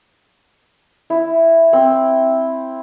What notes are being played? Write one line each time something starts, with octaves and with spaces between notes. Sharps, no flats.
E4
C4